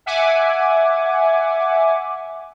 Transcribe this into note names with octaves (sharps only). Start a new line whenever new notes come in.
E5 F#5 G#5 D6